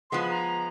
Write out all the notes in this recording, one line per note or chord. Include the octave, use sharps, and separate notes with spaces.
F3 G#3 B3 C6
B5
A#5